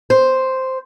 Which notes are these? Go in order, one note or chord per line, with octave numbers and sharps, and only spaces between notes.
C5